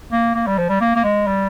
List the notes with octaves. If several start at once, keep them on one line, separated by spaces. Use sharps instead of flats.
A#3
A#3
G3
F3
G3
A#3
A#3
G#3
G3